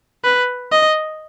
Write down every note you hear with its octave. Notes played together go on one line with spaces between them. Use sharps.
B4
D#5